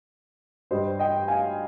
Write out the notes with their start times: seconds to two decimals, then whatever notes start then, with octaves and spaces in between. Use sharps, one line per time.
0.71 G2 G3 C5 D#5
0.99 D#5 G5
1.28 F5 G#5